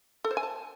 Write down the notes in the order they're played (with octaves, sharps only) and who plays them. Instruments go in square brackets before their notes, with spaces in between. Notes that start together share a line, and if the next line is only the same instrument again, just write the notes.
[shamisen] A4
C5
G#5
A5